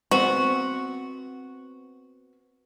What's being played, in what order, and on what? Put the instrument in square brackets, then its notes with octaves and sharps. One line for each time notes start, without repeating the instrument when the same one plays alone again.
[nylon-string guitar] B3 C4 [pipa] F#4